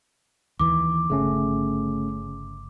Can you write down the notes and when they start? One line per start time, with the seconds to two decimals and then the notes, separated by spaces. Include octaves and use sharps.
0.59 D#2 E3 D6
1.10 G1 C#3 A3 C#4